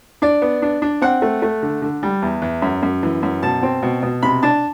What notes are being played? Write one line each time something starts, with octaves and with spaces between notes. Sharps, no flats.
D4 D5
B3
D4
D4
C4 F#5
A3
A3
D3
D3
G3
E2
E2
F#2
F#2
E3
F#2
B2 A5
C4
B2
B2
C3 B5
D4 A5